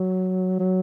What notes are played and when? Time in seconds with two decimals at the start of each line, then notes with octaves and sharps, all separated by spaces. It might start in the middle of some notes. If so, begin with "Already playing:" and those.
Already playing: F#3
0.59 F#3